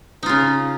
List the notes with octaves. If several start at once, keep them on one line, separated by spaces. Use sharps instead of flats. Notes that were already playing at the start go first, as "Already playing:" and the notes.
C#3 D#4 F4